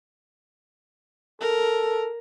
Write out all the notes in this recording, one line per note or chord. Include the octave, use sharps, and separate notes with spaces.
A4 A#4